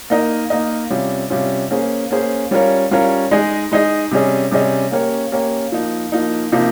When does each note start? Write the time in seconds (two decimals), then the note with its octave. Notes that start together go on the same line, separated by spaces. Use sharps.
0.10 A#3 D#4 A#4 D#5
0.50 A#3 D#4 A#4 D#5
0.90 C3 G3 C#4 F4
1.30 C3 G3 C#4 F4
1.71 A#3 C#4 G#4 C5
2.11 A#3 C#4 G#4 C5
2.51 G3 C#4 F4 A#4 C#5
2.91 G3 C#4 F4 A#4 C#5
3.31 G#3 D#4 G#4 D#5
3.72 G#3 D#4 G#4 D#5
4.11 C3 G3 C#4 G#4 D#5
4.51 C3 G3 C#4 G#4 D#5
4.91 A#3 C#4 G4 A#4 C#5
5.32 A#3 C#4 G4 A#4 C#5
5.72 F3 A#3 D#4
6.12 F3 A#3 D#4
6.52 C3 F3 A#3 D#4